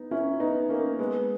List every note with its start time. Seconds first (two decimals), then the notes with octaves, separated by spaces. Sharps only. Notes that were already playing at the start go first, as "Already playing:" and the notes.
Already playing: B3 D#4
0.11 C#4 E4
0.40 B3 D#4
0.69 A#3 C#4
0.99 G#3 B3